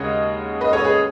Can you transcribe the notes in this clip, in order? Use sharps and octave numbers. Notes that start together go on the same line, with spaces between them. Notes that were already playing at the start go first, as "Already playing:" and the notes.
Already playing: D#2 C#3 G#3 C#5 D#5 F#5
B4 D#5
A4 C#5
G#4 B4